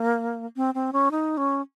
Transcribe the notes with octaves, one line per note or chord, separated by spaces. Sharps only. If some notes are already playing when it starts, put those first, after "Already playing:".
Already playing: A#3
C4
C4
C#4
D#4
C#4